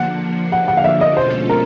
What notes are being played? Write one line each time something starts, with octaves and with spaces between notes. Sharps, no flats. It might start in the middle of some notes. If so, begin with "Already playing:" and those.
Already playing: D3 F3 A#3 D4 F#5
F#5
F#5
F5
E5
D#5
B2 G#3 C#4 F4 A4 C5
A#4